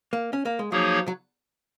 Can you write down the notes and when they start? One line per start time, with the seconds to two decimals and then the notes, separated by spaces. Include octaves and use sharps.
0.13 A#3
0.33 C#4
0.46 A#3
0.59 G#3
0.72 F3 F#3 A#3 D#4 G#4 C#5
1.08 F#3